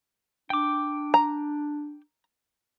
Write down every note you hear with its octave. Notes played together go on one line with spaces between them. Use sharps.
D4 G5 D6
A#5